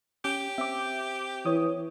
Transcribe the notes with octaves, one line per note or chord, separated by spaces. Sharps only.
C#4 G4
C4 E5 D6
E3 C#5 D#6